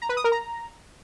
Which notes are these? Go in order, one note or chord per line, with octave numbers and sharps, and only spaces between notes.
A#5
B4
D#6
A#4
A#5